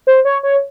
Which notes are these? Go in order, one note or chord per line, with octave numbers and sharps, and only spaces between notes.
C5
C#5
C#5